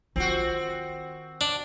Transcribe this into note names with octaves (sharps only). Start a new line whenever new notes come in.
D#3 C4 F4 F#4
D4